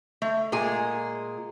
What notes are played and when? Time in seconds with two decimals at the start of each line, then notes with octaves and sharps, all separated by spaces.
0.22 A3
0.52 A#2 G#3 G#4 G#5